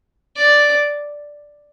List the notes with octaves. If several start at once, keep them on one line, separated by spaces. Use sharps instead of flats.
D5